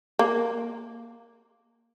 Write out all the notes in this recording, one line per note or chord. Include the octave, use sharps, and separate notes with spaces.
A#3